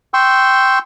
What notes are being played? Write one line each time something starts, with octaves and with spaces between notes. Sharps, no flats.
G5 C6 C#6 E6